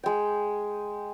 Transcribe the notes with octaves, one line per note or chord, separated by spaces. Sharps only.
G#3 G5